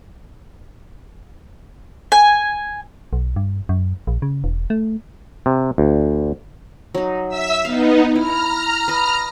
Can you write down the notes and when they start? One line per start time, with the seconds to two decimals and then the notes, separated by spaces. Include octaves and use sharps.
2.12 G#5
3.13 B1
3.36 G2
3.69 F#2
4.07 A#1
4.22 C#3
4.44 E1
4.70 A3
5.46 C3
5.78 D2
6.95 F#3 D#4
7.29 E5 E6 B6
7.65 B3 D#4 F5
8.15 E4 A#5 F6
8.88 B4 D#5